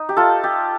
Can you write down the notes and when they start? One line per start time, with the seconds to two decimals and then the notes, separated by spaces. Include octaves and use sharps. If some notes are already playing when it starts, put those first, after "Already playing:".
Already playing: D#4
0.09 G4
0.17 F4 A4
0.44 G4